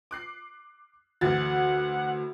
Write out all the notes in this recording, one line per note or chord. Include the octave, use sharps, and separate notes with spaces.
D6 F#6 C7
D2 E3 F#5 A6